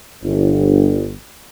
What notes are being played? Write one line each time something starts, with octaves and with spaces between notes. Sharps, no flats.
G1